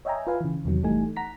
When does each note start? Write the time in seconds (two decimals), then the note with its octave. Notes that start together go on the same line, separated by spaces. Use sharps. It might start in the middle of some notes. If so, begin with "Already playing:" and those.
0.05 C#5 D#5 E5 G5 G#5 A#5
0.27 F4 B4 F5 G#5
0.41 C#3 E3
0.65 E2 C3 D#3 F#3
0.83 G1 E3 G3 A3 D#4 G#5
1.16 F#5 A#5 B6